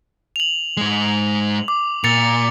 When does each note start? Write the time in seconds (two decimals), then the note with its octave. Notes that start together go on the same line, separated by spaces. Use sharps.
0.36 F7 F#7
0.77 G#2 G#3
1.68 D6
2.04 A#2 A6 C#7 F7